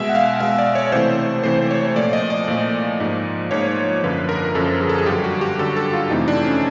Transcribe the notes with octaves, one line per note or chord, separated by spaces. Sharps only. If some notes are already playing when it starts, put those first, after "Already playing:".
Already playing: B2 G#3 E5
F#5
F5
B2 G#3 E5
D5
C#5
C3 E3 A3 C5
C3 E3 A3 C5
C#5
A#2 F3 A3 D5
D#5
D5
A#2 F3 A3
G#2 F3 A#3
G#2 F3 A#3 C#5
F#2 D3 F3 B4
A#4
F#2 D3 F3 A4
G#4
A4
G#4
G2 D3 F#3 G4
F#4
G4
G2 D3 F#3 A4
A4
F4
F2 C3 E3 A3 D#4
D4
C#4